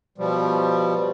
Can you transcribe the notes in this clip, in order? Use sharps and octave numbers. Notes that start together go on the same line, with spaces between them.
B2 F3 G3